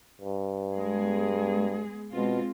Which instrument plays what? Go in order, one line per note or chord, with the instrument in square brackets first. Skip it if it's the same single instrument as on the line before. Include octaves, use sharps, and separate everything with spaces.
[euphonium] G2
[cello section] G#3 B3 G#4
[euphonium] B2 [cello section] G#3 C4 F4